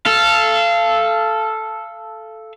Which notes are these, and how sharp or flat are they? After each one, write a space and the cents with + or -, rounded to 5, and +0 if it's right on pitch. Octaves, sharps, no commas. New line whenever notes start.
A4 -5 F5 -25